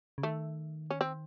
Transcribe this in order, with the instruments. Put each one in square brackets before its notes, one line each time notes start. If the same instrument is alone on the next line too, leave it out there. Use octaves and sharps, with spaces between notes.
[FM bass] C#3
[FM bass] D#3 [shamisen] A3
[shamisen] C#4
C4